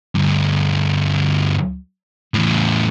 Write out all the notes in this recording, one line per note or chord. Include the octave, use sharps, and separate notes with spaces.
D2 G2
E2 A2